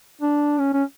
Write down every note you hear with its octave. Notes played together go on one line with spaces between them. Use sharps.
D4
C#4
C#4